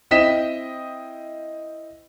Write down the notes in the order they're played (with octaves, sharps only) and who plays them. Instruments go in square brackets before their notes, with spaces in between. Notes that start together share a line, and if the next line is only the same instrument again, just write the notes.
[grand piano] C4 E4 D#5 G5 B6 E7